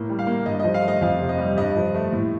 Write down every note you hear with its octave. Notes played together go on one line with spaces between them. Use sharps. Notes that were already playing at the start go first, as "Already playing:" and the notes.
Already playing: A2 A#3
G3
F5
A#3
G2 D#5
D#5
F3
F5
A3
D#5
F2 F5
C3
D#5
G3
G2 D#5
F3
A3
A2